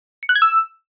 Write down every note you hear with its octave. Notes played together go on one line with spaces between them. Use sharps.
C#7
F#6
G#6
E6